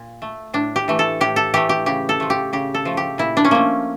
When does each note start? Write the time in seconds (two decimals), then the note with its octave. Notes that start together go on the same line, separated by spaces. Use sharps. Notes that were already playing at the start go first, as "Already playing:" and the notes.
Already playing: A#2
0.22 A3
0.54 A2 D4
0.76 G4
0.88 E3 A3
0.99 A4
1.21 A2 G4
1.36 A4
1.54 E3 A3 G4
1.69 G4
1.86 C#3 G4
2.09 A4
2.20 F3 A3
2.30 G4
2.53 C#3 G4
2.74 A4
2.85 F3 A3
2.97 G4
3.18 A#2 E4
3.37 D4
3.45 C#4
3.51 F3 A3 A#3